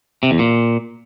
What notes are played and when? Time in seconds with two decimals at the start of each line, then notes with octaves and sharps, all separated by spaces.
0.23 C3
0.31 E2
0.39 A#2